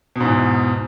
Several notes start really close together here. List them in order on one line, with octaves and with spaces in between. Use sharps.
B2 G#2 E2